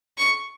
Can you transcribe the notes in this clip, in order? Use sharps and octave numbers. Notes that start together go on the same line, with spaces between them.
C#6